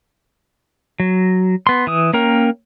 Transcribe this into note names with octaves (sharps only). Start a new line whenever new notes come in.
F#3
B3 C6
E3 D#6
A#3 C#4 A#4 G5